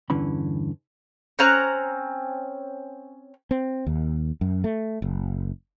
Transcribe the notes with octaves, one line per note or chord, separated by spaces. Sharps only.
E2 G2 D3 E3 C#4 B5
C4 C#4 A#5 F#6
C4
D#2
F#2
A3
F#1